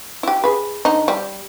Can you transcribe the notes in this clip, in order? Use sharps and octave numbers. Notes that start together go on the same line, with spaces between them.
E4 G4
G#4 B4
D3 D#4
G3